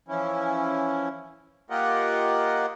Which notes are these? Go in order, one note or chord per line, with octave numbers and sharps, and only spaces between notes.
E3 F3 C#4 E4
A#3 F4 G4 A#4 D#5 F#5